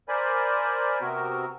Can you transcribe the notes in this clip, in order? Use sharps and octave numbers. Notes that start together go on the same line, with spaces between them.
A#4 C5 D5 G#5 B5
C3 B3 C4 F#4 A#4